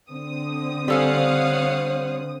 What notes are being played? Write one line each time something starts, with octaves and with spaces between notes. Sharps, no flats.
D3 C4 D#6
G3 A4 C5 C#5 F5 F#5 G#5